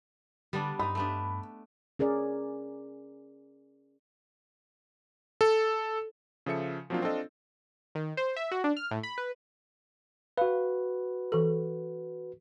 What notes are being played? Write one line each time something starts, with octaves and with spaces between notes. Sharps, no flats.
D3 G3 B3 D4
G2 C4 D#4 B5
A3 B3 D4
C#4 G#4 A#4 D5
A4
C#3 F3 A4 E5 C#7
F3 F#3 A#3 C4 D4 F4
C4 D4 F4 A4 D#5
D#3
C5
E5
F#4
D4
F6
A2
B5
B4
F#4 B4 F5
E3 A4